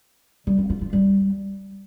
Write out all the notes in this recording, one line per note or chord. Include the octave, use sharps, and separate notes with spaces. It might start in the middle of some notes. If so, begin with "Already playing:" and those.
G3
C4
F4
F4
G3